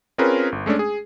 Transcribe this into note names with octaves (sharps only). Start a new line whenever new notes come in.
C4 C#4 F4 G#4 A#4 B4
G1
G#3 A3 C#4 D4
G#4